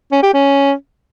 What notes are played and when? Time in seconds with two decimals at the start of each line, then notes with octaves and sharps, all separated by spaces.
0.12 C#4
0.23 G4
0.34 C#4